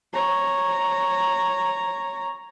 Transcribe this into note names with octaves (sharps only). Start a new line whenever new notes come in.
C#5 A#5